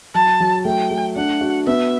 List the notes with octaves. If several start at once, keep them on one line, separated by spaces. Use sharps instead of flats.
F#3 A5
F#3
A3 G5
A3
D4 F#5
F#4
B3 E5